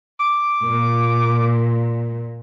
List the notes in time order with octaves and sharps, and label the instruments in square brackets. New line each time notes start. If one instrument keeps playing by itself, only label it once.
[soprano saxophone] D6
[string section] A#2